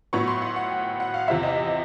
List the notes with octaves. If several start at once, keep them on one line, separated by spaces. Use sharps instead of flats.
A2 F#3 B3 C#6
C6
F#5
F#5
G5
F#5
F5
E2 C3 F3 E5
D#5